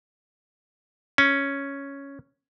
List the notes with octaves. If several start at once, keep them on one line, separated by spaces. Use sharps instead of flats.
C#4